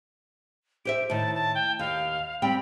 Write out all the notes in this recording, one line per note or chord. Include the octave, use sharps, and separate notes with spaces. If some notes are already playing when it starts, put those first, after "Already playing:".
G4 C5 E5 D7
A2 D#3 A5
A5
G5
D#2 F5
G3 C4 G5 B5